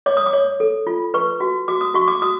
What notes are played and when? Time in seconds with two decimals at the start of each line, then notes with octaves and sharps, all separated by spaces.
0.06 C#5 D6
0.17 D#6
0.26 D6
0.33 C#5
0.60 A4
0.87 F4
1.14 B4 C#6
1.40 F#4
1.68 F#4 D6
1.81 D#6
1.94 F#4 C#6
2.08 D6
2.22 F#4 D#6